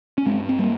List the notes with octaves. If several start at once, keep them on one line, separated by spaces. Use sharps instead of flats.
C#4
G2 G#3 C4
C4
G3 A#3